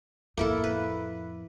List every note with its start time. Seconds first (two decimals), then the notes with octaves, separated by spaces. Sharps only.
0.37 F2 A2 A#3 E4 A4
0.64 B4